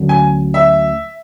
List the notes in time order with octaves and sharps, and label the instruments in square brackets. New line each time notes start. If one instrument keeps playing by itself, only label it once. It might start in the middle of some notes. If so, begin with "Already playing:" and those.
Already playing: [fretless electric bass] D2 D3 F#3 C#4
[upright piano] G#5
E5